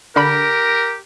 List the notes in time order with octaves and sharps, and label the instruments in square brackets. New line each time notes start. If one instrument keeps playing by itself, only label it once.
[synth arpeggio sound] D3 B5 [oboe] G4 [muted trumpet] A#4